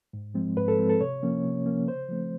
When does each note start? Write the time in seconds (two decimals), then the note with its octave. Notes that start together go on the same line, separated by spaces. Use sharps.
0.13 G#2
0.34 F3 G#3 C4
0.56 G#2 B4
0.68 A4
0.78 F3 G#3 C4
0.89 A4
1.00 C3 C#5
1.23 F3 A#3 C#4
1.44 C3
1.66 F3 A#3 C#4
1.88 C#3 C5
2.09 F3 A3 C4